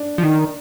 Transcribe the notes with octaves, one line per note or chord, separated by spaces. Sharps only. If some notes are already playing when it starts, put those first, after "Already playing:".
Already playing: D4
F3
D#3